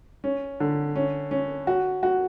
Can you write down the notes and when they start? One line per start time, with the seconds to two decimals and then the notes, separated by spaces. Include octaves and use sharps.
0.24 C#4
0.60 D3
0.96 C#4
1.31 C#4
1.67 F#4
2.03 F#4